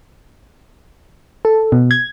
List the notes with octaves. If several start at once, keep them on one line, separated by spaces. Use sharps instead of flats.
A4
B2
G#6